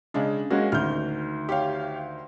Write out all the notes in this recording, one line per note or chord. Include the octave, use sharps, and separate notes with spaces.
C#3 G#3 D4
G#3 A#3 C#4 F#4
D2 D#3 F6 G6
G4 C#5 F5